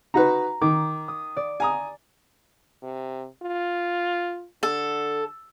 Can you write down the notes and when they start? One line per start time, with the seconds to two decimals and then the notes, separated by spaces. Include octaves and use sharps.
0.14 D#4 F#4 B4 A#5
0.61 D#3 D6
1.08 D#6
1.37 D5
1.60 G#5 A#5 D#6
2.83 C3
3.43 F4
4.63 D3 A4